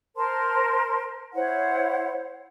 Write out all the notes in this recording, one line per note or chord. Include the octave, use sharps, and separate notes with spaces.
A#4 C5 A5 C6
E4 C5 C#5 F#5